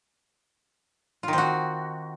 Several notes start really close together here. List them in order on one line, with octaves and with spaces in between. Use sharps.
F4 D#3 C4 F#4